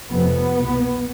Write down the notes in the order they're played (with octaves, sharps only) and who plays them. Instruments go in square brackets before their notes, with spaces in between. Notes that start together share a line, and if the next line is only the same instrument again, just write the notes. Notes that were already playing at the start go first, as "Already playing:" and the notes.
[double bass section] F1 F2 C3 B3
C2 B2